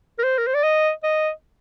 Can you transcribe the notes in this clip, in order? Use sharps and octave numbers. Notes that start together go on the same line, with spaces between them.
A#4
C5
A#4
C5
D5
D#5
D#5